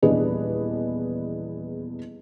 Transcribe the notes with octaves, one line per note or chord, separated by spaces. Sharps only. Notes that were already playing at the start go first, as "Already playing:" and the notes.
D#1 E2 D4 G#4 B4 D#5